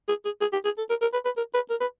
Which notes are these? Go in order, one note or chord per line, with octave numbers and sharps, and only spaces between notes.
G#4
G#4
G#4
G4
G#4
A4
A#4
A#4
B4
B4
A#4
B4
A#4
B4